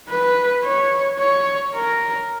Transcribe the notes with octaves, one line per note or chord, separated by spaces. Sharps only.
B4
C#5
C#5
A#4